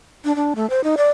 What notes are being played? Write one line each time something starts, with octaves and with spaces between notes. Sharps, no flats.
D4
D4
A3
C5
D#4
D5